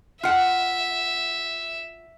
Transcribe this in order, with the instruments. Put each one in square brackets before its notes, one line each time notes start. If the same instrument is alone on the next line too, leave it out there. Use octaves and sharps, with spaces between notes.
[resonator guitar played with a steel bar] F4 F#5 [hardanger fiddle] E5